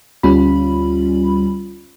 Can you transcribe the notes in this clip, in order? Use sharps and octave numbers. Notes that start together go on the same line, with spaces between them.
D2 G3 C#4 F4 B5